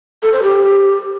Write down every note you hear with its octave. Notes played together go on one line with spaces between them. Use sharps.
A4
C5
G4